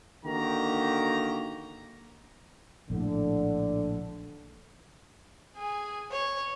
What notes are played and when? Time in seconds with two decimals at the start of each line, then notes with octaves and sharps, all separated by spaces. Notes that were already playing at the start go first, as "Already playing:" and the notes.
0.24 D3 D#3 A#3 F#4 G4 A#5
2.90 A#1 A2 D3
5.56 G#4 G#5
6.11 C#5